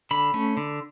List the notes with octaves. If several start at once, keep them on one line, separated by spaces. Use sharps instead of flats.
D3 B5
A3 C#4
D3